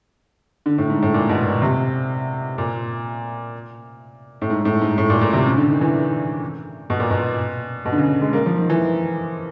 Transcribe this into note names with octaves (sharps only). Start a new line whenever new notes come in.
D3
A2
G#2
A2
A#2
B2
A#2
C3
A#2
A2
G#2
A2
G#2
A2
A#2
A#2
C3
C#3
D3
D#3
E3
D#3
B2
A#2
B2
B2
D3
C#3
G#3
A#3
F3
D#3
E3